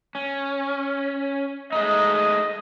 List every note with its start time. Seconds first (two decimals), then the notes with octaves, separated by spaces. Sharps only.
0.15 C#4
1.72 G#3 A3 D#4 D#5